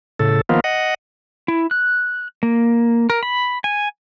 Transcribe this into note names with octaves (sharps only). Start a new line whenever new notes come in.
A2 C#3 A4
D#3 F3 A#3 B3 F4
D#5 F#5
E4
F#6
A#3
A#4
B5
G#5